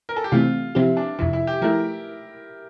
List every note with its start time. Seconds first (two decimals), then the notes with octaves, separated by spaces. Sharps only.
0.09 A#4
0.16 A4
0.24 G4
0.32 C3 E3 A3 C4 F4
0.75 C3 F3 C4 E4 G4
0.97 D4
1.19 F2 C3 F3 E4
1.33 E4
1.47 G4
1.62 F3 A3 E4 A#4